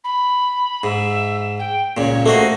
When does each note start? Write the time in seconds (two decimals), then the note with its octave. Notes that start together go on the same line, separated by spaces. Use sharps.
0.04 B5
0.83 G#2 E5
1.58 G5
1.97 C#2 A#2 C#5
2.26 A3 A#3 F#4 C5 D#5